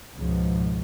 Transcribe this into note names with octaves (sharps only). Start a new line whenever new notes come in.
C#2 G#2 B2 F3